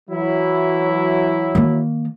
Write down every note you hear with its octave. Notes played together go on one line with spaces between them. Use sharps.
E3 F#3 E4
D#3 A#3